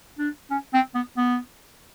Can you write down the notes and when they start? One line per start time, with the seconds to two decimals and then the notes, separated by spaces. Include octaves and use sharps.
0.19 D4
0.51 C#4
0.74 C4
0.94 B3
1.17 B3